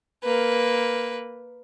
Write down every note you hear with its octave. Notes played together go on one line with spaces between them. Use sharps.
A#3 B4